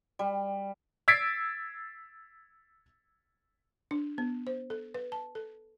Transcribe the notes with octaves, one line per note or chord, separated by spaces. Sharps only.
G3
E6 G#6 A6 B6 C7 D7
D4
B3
C5
A4
B4
A5
A4